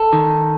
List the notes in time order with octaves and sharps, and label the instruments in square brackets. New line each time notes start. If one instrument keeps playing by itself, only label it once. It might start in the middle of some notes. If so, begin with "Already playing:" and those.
Already playing: [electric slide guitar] A4
D#3